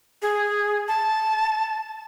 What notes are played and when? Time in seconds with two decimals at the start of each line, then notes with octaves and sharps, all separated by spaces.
0.22 G#4
0.88 A5